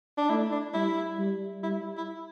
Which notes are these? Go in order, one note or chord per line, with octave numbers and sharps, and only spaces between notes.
D4
A3 E4
D4
G3 E4
G3
G3 E4
E4